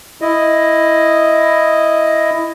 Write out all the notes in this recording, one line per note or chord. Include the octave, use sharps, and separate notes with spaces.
E4 D#5